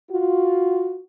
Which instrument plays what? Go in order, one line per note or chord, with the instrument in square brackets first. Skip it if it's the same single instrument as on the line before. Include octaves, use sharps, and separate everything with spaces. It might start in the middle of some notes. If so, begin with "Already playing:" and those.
[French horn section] F4 F#4